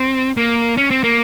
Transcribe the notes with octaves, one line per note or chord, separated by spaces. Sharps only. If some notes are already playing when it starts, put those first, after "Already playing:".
Already playing: C4
A#3
C#4
C4
A#3